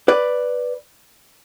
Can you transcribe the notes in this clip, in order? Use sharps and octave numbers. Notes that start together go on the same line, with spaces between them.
B4 D5